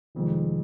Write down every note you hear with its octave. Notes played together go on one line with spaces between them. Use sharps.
F1 F2 D#3 G#3